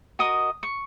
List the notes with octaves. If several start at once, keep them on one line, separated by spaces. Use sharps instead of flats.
F#4 A#4 D#5 D#6
C#6